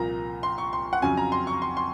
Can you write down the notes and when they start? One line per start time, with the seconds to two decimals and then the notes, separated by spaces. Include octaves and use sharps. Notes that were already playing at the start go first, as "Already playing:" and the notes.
Already playing: C2 A#2 F3 A#3 A#5
0.43 C6
0.58 C#6
0.73 C6
0.93 F#5
1.02 F2 C#3 F#3 C#4 G#5
1.17 A#5
1.32 C6
1.47 C#6
1.62 C6
1.77 C6